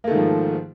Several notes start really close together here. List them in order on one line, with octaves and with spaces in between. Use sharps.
A#3 A3 D#3 G#2 F3